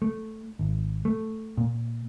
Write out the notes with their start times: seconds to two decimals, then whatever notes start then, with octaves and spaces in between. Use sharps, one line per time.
0.02 A3
0.59 G#1
1.05 A3
1.58 A#2